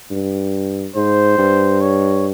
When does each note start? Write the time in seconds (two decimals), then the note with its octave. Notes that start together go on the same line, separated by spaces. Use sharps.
0.11 G2
0.96 G#2 C5
1.38 G2
1.81 C#5